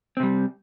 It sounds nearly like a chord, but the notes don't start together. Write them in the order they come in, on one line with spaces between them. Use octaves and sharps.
C4 C3 G3